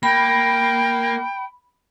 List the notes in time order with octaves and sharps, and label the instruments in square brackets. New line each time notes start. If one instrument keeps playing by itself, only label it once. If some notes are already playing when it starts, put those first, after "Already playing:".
[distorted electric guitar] A#3 [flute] G5 [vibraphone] B5